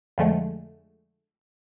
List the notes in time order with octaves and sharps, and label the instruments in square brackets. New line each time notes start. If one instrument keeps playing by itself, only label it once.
[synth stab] F2 D3 F3 G#3 A3